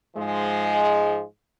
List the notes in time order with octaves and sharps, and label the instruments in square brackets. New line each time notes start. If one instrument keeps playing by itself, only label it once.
[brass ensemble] G#2 F3 G#3